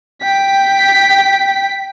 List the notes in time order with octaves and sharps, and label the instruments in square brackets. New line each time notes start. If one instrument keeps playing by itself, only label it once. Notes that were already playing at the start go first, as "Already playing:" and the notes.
[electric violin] G5 B6